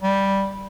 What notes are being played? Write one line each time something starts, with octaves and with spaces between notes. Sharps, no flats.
G3